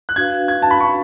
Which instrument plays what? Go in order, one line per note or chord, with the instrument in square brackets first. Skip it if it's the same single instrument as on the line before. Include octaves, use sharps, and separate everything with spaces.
[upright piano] F#6
[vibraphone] D4 F#4 B4 F5 [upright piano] G#6
[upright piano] G#6
A5
B5
C#6